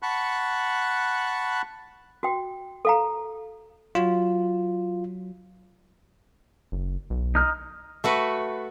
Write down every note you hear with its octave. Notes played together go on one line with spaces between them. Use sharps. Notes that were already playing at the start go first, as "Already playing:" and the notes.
F#5 A5 B5 C#6 F#6
F#4 G5
A4 F5 A#5
F#3 F4
F#1
B1
D#4 F6
A3 F#4 B4